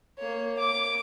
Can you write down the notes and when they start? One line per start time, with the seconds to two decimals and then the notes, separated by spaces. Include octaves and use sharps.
0.18 A#3 C#5
0.59 D6